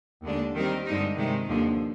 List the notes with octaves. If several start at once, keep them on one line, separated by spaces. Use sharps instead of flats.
D#2 D3 G#3 D4
D#3 G3 C4 G4 A#4
G2 D3 G#3 D#4
C3 D#3 G#3
D#2 D3 F3